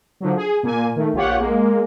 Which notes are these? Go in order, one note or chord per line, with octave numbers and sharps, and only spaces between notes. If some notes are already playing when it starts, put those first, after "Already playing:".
D3 F3 F#3
G#4
A#2 A#3 G#5
D#3 A3
A#1 F4 G4 C#5 F#5
G#3 A#3